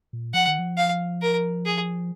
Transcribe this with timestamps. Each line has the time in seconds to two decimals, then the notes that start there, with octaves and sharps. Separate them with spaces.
0.13 A#2
0.34 F3 F#5
0.47 D#3
0.59 F3
0.77 F5
1.22 A#4
1.65 G#4